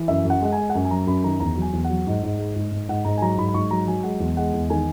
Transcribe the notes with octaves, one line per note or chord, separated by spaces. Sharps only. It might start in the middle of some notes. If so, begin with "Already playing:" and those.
Already playing: E3
F#2 E5
F#2 F#5
G#3 F#5
G#5
G#3
F#5
F#2 G#5
G#5
F#3 A#5
F#2 B5
D#3 A#5
E2 A#5
F#3
G#5
E2
F#5
F#3
G#2
G#2
G#3
G#2
G#2
G#2 F#5
G#2 A#5
G#5
F#3 A#5
G#2 B5
B5
G#2 C#6
F#3 A#5
F#3 G#5
G#3 F#5
E2
G#3 F#5
E2
D#3 G#5